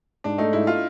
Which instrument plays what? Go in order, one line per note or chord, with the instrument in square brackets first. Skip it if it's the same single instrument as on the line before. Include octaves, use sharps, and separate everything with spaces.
[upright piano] G#2 [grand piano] D4
[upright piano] A3 [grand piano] D#4
[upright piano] G#2 [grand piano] E4
[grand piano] F4